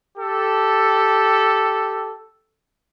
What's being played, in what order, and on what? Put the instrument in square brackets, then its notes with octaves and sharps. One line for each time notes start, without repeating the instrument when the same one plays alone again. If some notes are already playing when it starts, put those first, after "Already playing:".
[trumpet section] G4 A4